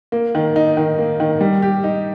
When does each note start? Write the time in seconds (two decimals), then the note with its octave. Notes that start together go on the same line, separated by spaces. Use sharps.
0.12 A#3
0.35 D#3
0.56 D#4
0.77 D#3
0.99 A#3
1.20 D#3
1.41 G3
1.62 G4
1.84 D#4